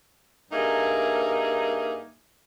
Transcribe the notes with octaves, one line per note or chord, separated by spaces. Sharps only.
G2 A#3 D#4 G#4 E5